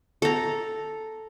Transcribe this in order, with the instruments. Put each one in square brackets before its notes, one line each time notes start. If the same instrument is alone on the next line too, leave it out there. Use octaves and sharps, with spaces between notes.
[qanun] A4 A#5